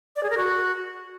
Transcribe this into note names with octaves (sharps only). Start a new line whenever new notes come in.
D5
G#4
A#4
F#4